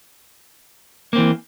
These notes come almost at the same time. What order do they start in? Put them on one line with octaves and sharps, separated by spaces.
A#3 C4 E3